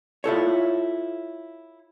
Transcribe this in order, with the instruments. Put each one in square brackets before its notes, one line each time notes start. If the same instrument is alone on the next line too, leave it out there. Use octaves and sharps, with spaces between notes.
[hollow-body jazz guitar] E4 F4 A4 C#5